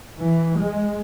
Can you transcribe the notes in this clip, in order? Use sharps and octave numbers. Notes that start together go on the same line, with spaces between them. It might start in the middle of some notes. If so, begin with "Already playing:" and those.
E3
G#3